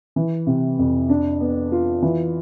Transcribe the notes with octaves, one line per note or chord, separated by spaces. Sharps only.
E3
C3
F2
D4
B3
F4
E3